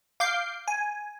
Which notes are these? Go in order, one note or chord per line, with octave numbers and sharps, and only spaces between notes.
F5 D6 G6 C7
G#5